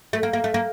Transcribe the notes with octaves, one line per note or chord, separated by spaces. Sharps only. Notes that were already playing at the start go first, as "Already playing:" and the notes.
A3
A#3
A#3
A3
A#3